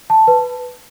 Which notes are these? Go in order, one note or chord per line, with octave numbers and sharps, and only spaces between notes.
A5
B4